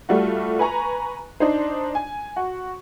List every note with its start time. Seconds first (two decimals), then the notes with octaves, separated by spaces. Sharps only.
0.09 G3 A3 F4 F#4
0.59 B4 G#5 A#5 C#6
1.40 D4 D#4 C5
1.95 G#5
2.36 F#4